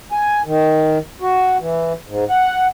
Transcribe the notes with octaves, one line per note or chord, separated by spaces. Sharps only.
G#5
D#3
F#4
E3
G#2
F#5